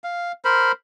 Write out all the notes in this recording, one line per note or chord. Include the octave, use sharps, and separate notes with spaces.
F5
A#4 C5 B5